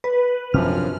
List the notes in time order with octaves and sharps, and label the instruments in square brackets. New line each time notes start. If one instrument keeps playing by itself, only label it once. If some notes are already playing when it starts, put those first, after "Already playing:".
[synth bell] B4
[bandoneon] F#2 F3 [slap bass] C3 C#4 D4 [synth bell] F6